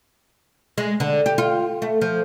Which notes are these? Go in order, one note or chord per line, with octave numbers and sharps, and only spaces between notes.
G#3
D3
G4
F4
A3
F3